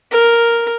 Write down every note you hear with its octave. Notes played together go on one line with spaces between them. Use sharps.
A#4